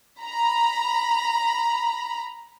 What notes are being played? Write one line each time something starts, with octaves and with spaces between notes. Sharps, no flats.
A#5 B5